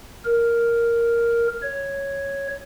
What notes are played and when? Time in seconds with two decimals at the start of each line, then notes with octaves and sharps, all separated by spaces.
0.25 A#4
1.62 C#5